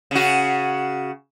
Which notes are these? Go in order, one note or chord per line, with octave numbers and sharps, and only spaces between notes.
C#3 F#4